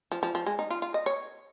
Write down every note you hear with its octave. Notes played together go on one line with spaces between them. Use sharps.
F3
F3
F3
G#3
D#4
F4
F4
D#5
C#5